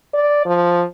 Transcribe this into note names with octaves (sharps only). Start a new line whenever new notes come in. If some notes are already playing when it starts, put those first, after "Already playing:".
D5
F3